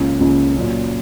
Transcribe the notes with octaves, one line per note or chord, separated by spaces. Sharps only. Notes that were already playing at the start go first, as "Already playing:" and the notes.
Already playing: C#2 C#3 A#3 C#4
C#2 C#3 A#3 C#4
A#2 F#3 C#4